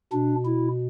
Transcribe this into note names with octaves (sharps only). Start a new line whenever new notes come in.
B2 D4
E4